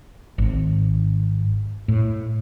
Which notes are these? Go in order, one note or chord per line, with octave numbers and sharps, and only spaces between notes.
G#1
A2